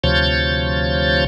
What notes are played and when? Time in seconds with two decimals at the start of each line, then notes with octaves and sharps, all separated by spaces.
0.04 D2 C3 F3 C#5 G6 A6